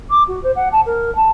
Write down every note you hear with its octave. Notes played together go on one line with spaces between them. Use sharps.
D6
F#4
C5
F#5
A5
A#4
A5